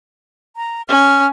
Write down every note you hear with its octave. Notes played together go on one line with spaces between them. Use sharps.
A#5
C#4 F6